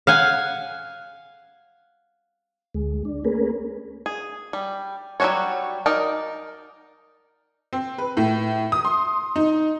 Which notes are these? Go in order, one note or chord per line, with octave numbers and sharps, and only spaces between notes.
F5 F#5 G#5
D2 G#3
D4
A3 A#3 C#4 G#4 A#4 B4
G#4
G3
F#3 G3 C#4 F#4 C#5
D#4 A#4 D5
C4
B4
A2
D#6
C6
D#4